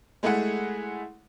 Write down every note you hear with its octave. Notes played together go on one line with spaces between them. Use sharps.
G#3 A3 E4 G#4 F#5